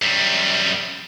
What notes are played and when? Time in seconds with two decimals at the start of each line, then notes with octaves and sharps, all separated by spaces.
0.02 F#2 G3